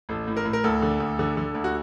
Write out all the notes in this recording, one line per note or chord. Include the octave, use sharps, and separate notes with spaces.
A1 A4
A2
A#4
A2
A#4
D2 A4
D3
D2
D3
D3
D2
F#4